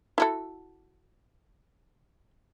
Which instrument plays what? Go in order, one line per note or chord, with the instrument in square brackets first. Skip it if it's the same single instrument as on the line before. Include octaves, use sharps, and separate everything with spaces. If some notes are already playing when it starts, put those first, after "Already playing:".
[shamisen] E4 F#4 A4